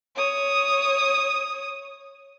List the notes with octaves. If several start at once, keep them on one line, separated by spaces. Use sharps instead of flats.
C#5 D#6